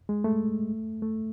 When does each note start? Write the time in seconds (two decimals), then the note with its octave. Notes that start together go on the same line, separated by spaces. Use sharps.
0.09 G#3
0.24 A3
1.02 A3